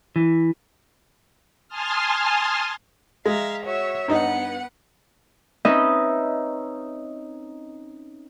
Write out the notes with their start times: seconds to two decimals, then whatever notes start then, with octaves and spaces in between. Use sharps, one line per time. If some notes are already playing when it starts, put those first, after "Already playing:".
0.16 E3
1.68 G#5 A5 C6 D#6 F6
3.26 G#3 E5 F5 A#5
3.64 F#4 C#5 E5
4.08 G2 B3 D#4 D#5 F#5
5.65 C4 C#4 D#4 B4 D#5 E5